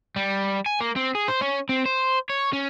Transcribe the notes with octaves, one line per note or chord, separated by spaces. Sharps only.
G3
G#5
A#3
C4
G#4
C5
C#4
C4
C5
C#5
C#4